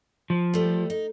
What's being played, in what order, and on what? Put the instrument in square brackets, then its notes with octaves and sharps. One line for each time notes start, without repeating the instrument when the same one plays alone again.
[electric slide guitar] F3
[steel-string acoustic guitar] G3 A3
D#4